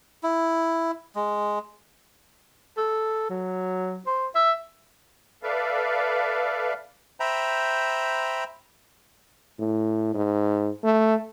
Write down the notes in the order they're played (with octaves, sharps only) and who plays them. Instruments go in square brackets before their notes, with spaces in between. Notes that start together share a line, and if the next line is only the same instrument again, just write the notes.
[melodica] E4
G#3
[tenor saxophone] A4
F#3
C5
E5
[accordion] A4 B4 D5 E5 F5
[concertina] C5 E5 G5 A#5 B5
[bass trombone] A2
G#2
A3